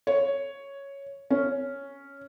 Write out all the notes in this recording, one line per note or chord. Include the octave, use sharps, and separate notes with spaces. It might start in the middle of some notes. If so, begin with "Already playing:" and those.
C#5
C#4